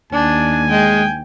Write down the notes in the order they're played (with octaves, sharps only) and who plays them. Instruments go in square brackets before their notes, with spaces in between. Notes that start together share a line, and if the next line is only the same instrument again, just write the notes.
[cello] D#2 [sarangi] D4 [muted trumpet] G#5
[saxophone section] G#3 [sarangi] G5